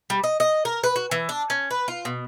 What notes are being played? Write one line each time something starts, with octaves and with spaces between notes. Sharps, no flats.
G3
D#5
D#5
A#4
B4
F#4
E3
D4
C#4
B4
F4
B2